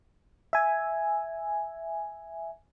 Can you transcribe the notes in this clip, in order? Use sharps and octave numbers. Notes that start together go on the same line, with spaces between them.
E5 G#5